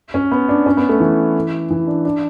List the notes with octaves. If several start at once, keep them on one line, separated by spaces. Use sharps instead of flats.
C#4
B3
D4
C#4
B3
A3
E3
E3
D4
D4